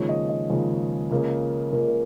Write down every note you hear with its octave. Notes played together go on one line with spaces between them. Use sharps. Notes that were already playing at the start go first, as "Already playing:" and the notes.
Already playing: D#2 C#3 F3 G#3 C#5
D#5
D#5
D#2 C#3 F3 G#3
C#2 C#3 A#3
C#2 C#3 A#3 A#4
A#4